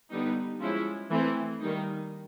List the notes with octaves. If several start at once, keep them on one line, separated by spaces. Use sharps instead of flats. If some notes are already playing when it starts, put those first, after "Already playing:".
D3 G3 B3 D#4
F3 G#3 C#4 E4
E3 A3 C4
D#3 G3 A#3 D#4